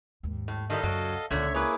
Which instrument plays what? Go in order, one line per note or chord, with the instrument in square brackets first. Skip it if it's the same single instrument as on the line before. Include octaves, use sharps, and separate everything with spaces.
[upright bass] D#2 G#2
[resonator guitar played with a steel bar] A2
[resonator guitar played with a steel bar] D#3 G3 E4 [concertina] A4 D#5 F5
[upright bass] C#2 F#2 [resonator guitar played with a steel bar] F#3
[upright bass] C#2 [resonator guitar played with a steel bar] A#2 D3 [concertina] C#5 E5
[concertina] A#3 E4 G#4 [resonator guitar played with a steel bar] B4 C#5